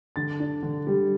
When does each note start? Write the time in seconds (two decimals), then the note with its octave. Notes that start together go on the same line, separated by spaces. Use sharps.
0.16 D3 A6
0.40 D4
0.63 D3
0.87 G3